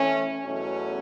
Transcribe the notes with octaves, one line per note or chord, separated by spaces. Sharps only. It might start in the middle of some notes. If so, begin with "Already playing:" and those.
Already playing: E3 A3 C#4 E4
E2 B2 F#3 A3 C#4